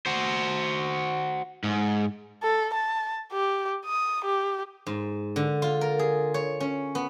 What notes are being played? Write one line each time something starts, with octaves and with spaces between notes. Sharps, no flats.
F#4 C5
G#2
A4
A5
G4
D#6
G4
G#2
D3
F4
A#4
G#4
C#5
C#4
B3